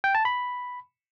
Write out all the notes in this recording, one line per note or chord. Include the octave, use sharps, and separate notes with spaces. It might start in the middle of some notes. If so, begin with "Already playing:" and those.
G5
A5
B5